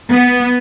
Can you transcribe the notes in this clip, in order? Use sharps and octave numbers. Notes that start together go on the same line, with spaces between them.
B3